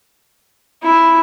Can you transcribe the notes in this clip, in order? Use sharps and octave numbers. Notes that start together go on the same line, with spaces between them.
E4